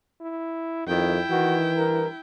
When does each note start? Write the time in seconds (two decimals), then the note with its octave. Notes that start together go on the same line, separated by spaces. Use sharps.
0.21 E4
0.87 F2 D#3 E4 G5
1.31 D#3 E3 F#4
1.77 G2 A#4